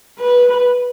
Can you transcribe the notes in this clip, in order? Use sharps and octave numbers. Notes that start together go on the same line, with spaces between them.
B4